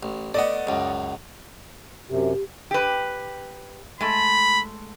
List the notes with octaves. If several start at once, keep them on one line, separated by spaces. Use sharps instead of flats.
A1
A3 B3 D5 D#5 F#5
C#2 F#2
F#2 C3 G4
G4 B4
G#3 A3 B5